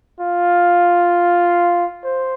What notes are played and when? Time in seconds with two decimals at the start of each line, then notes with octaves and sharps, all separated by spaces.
0.20 F4
2.04 C5